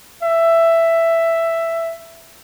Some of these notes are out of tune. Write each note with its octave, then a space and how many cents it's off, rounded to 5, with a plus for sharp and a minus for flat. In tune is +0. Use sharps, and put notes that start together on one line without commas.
E5 +10